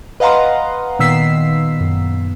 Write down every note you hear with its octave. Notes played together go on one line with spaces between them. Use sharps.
B4 D#5 F5 F#5 A#5 C6
A#2 D#3 B3 E6 B6 C7
F#2